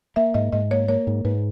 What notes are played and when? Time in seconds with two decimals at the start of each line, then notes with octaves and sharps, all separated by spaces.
0.16 A#3 E5
0.34 G#2 D#5
0.53 G#2 D#5
0.71 A#3 C#5
0.88 A#3 C#5
1.07 G#2
1.25 G#2 B4